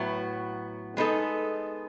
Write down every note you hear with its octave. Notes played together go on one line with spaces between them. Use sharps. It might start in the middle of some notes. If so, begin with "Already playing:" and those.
Already playing: A2 F#3 B3
G#3 B3 D#4 A4